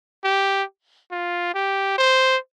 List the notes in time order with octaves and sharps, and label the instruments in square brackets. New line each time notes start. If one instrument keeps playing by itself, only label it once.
[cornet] G4
F4
G4
C5